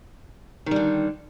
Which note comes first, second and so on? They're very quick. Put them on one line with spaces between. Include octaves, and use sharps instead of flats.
D#3 G3 D3